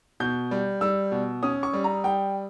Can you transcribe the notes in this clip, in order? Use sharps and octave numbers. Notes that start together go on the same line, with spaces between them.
B2 G6
G3
G3 E6
B2
C#4 D#6
C#6
G3
A#5
G3 G5